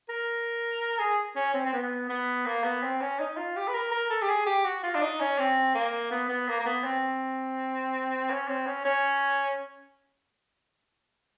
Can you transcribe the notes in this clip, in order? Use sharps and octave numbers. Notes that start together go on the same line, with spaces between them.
A#4
G#4
C#4
C4
C4
B3
B3
A#3
B3
C4
C#4
D#4
F4
G4
B4
A#4
A#4
A4
G4
G#4
G4
F#4
F4
D4
D#4
C#4
C4
A#3
B3
B3
A#3
A#3
B3
C4
C#4
C4
C#4
C#4